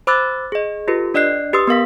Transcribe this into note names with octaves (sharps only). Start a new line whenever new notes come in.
C5 B5 D6 E6 F#6 A6
G#4 D#5
F4 G4 A4 B4
D4 D5 D#5 F#6 C7
G4 B4 C6 D#6 E6
B3 A#4 F5 B6